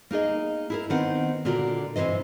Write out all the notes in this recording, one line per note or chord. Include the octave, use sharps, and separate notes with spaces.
A#3 D#4 G#4 D#5
E4 G#4 A#4
D#3 B3 C4 F#5
A#2 D3 F4 F#4 A#4 D5
C3 D#3 E3 C5 D#5